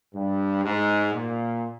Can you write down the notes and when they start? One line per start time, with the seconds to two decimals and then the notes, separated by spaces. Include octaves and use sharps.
0.14 G2
0.64 G#2
1.14 A#2